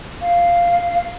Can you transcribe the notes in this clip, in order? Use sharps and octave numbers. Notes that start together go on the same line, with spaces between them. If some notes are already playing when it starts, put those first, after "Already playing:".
F5